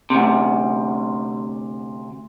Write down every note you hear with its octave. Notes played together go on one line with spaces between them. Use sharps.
D2 C3